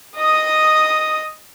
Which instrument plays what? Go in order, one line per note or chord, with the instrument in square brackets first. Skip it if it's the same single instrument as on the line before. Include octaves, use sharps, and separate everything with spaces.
[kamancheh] D#5 D#6